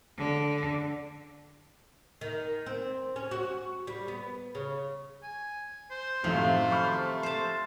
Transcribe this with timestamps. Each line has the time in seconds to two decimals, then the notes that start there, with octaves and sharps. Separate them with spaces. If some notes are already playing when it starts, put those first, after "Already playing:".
0.17 D3
2.21 D#3
2.66 C4
3.16 C#4
3.31 F#4
3.87 G3
4.08 B3
4.55 C#3
5.23 G#5
5.91 C5
6.24 F#2 A2 C3 D#3 F3 A3
6.71 B5 C#6 F6
7.23 C5 A5